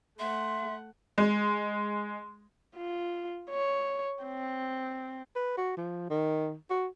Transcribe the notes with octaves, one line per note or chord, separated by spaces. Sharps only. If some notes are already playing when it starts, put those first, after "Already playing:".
A3 E5 F#5 C6
G#3
F4
C#5
C4
B4
F#4
F3
D#3
F#4